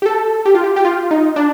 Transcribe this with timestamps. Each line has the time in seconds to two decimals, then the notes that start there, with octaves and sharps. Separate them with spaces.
0.02 G4
0.06 A4
0.45 G4
0.55 F4
0.64 G4
0.76 G4
0.85 F4
1.11 D#4
1.36 D4